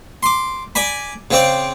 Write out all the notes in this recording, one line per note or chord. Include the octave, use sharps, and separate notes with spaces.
C6 D6
D5 G#5 B5
C#3 C4 D5